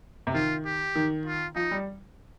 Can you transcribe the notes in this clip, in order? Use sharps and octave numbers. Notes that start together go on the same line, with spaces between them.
C3
D#3 F4
G4
D#3
F4
F3 D#4
G3